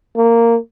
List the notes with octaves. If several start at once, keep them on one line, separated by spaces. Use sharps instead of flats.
A#3